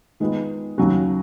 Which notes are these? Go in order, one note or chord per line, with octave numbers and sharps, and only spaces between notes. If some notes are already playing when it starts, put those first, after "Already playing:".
D#3 G#3 B3 F4
D#2 C#3 F#3 C#4 F#4